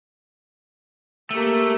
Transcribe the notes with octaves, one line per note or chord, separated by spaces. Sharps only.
A3 A#3 G4